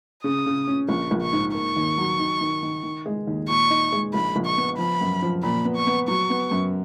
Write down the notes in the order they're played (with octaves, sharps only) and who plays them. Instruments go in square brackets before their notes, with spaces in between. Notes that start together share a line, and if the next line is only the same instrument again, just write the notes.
[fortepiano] C#3 [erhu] D#6
[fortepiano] C#3
C#4
[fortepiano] A#1 [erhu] C#6
[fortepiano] A#1
[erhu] C#6
[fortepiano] G#2
[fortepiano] A#3 [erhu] C#6
[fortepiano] D#2
F#3
D#3
D#3
D#3
D#3
G#3
D#2
[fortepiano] A#2 [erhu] C#6
[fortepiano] D#4
G#3
[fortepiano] A#1 [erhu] B5
[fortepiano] A#1
[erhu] C#6
[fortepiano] B3
[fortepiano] F3 [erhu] B5
[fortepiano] F#2
F3
[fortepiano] A#2 [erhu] B5
[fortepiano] B3
[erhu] C#6
[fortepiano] B3
[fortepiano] F#3 [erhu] C#6
[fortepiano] B3
F#2